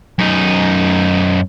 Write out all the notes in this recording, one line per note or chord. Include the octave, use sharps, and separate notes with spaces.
F#2 D#4